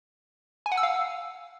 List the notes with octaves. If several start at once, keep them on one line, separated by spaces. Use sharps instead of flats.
G#5
F#5
E6
F5